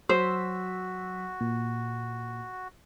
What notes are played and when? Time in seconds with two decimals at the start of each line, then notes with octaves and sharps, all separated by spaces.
0.09 F#3 F#4 C5 E6 B6
1.41 A#2